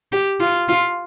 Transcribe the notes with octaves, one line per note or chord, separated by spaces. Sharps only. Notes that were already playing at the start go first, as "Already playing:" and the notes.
G4
F4
F4